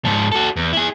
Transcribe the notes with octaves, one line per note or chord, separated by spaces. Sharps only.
G#2 F3
F#4 A4
E2
E4 G#4